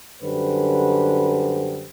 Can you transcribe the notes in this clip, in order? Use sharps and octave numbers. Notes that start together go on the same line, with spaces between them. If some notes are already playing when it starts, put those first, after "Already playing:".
F#2 D3 G3 B4 C5